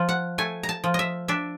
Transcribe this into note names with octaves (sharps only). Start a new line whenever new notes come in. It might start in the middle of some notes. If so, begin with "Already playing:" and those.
Already playing: F3
F#5
A3 G#5
A#5
A5
F3
D#5 E5
D4 E5